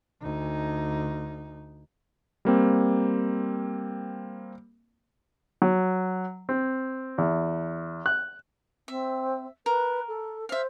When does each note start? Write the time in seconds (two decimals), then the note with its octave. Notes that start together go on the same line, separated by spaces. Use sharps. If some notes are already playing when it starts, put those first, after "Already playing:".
0.22 D2 D#4
2.45 G3 A#3 C4
5.62 F#3
6.49 C4
7.18 E2
8.06 F#6
8.88 C4 E5
9.66 A#4 B4
10.08 A4
10.49 C5 E5 F5